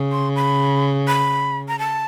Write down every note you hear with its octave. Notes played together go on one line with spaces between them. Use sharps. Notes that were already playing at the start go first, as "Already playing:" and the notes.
Already playing: C#3
C6
B5
B5
A#5
A5